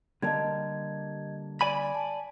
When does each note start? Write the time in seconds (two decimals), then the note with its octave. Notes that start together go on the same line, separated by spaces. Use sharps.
0.22 D3 G3 A#3 D#5 A5 G#6
1.61 D5 G#5 B5
1.95 A5